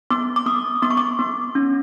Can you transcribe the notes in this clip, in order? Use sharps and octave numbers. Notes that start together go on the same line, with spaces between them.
B3 D6
D6
B3 D#6
B3 D6
C#6
D6
B3
C#4